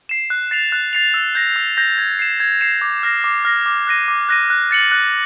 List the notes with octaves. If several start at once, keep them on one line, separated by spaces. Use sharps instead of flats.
C7 E7
F#6
A6 C7 F7
F#6
A6 C7 F7
E6
G6 A#6
E6
G6 A#6
G#6
C7 E7
G#6
C7 E7
D6
F6 A#6
D6
F6 A#6
D6
F#6 A#6 D#7
D6
F#6 A#6 D#7
F#6
A6 C#7 F#7
F#6